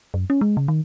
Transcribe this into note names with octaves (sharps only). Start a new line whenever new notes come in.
F#2
C#4
G#3
C#3
D#3